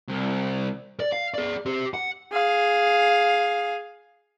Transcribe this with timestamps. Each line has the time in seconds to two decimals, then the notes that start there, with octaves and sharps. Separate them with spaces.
0.08 C2
1.00 D5
1.12 F5
1.34 G#4 D5
1.66 G4 C5
1.94 F#5
2.32 G#4 F5